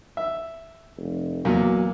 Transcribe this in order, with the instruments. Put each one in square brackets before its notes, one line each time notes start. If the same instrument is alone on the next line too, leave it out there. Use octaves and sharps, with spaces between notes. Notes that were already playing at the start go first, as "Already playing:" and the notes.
[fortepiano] E5
[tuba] F1
[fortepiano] E2 A#2 [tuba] F#3